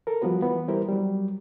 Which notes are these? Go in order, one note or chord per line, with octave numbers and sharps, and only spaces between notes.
A4 A#4
F3 G3 B3 F#4 B4
E3 B3
G3 E4 G4 A#4 C5
F#3 G3